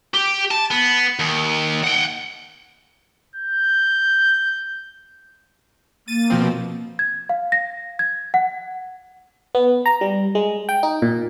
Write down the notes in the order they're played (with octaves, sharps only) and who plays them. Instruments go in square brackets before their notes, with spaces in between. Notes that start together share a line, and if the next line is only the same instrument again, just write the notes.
[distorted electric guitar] G4
A5
B3
D#2
F#5 G5
[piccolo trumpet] G6
[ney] A#3 [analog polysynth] A6 D#7
[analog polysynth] B2 F3 C4
[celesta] G#6
F5
A#6
G#6
F#5
[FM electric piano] B3
A#5
G3
G#3
G5
D#4
A#2